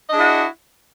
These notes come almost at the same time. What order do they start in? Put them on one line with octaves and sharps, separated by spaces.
D#5 D4 G#4 E4 F#4